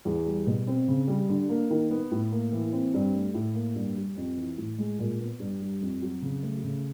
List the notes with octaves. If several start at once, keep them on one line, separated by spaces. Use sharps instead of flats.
E2
G3
B2
C4
C#3
G3
D3
A#3
D#3
B3
A2
A#3
E3
C4
G2
A3
A2
A#3
G2
G3
F2
E3
A2
G#3
A#2
B3
G2
G3
F2
F#3
C#3
A3
C#3